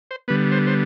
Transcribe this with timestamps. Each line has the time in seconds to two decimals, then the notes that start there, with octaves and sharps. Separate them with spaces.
0.11 C5
0.28 D3 G3 B3 B4
0.52 C5
0.67 C5